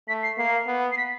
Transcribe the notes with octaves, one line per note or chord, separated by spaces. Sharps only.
A3 B6
C7
A#3 C7
B3
C7
B6